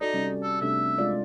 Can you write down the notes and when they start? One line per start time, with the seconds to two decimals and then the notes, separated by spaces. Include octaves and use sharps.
0.01 D#4 F#4 A4 D5
0.13 C3 G3 C#4
0.43 A4
0.61 C3 A3 D4 E5
0.98 G#3 F4 D5